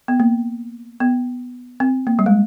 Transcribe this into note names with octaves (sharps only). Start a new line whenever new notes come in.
B3
A#3
B3
C4
A#3
G3
G#3